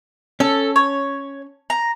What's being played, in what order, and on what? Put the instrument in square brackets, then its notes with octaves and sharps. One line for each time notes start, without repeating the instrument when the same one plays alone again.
[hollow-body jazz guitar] C#4 [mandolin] A4
[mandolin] C#5
A#5